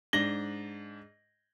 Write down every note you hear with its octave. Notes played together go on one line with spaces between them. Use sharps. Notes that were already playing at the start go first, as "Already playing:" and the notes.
G#2 D4 A#6 F#7 G7